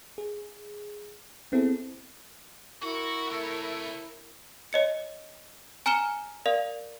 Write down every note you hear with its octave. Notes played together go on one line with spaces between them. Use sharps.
G#4
B3 C4 E4 G#4 A4
E4 F#4 A#4 C#6
C3 A3 C#5
C#5 D#5 C#7
G#5 A#5 F6 C#7 E7 G7
A#4 D5 F5